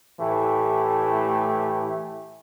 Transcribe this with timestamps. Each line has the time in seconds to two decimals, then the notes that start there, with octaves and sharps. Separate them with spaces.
0.20 A2 E3 A3 G4